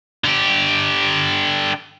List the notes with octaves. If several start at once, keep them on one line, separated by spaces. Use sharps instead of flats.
D3 G4